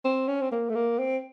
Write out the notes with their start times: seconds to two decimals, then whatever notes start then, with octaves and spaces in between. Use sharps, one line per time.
0.05 C4
0.28 C#4
0.41 C4
0.52 A#3
0.69 A3
0.75 A#3
0.99 C4